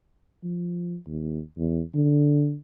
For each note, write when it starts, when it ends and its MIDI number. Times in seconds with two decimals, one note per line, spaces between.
0.44 0.96 53
1.07 1.40 39
1.58 1.81 40
1.94 2.55 50